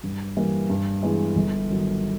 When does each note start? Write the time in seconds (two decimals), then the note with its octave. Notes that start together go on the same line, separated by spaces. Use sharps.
0.04 G2
0.37 E3 G3 A#3
0.70 G2
1.03 E3 G#3 B3 E4
1.36 G1
1.69 G2 D#3 F#3